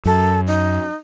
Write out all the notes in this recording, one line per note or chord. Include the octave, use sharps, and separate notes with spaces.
F#2 A4
D#4